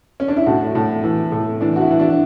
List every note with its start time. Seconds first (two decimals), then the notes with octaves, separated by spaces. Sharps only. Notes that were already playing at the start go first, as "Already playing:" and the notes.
0.20 C#4
0.28 D4
0.37 E4
0.46 A2 F#4
0.75 A2
1.04 E3
1.32 A2
1.61 E3 D4
1.76 F#4
1.81 E4
1.91 E3
2.00 D4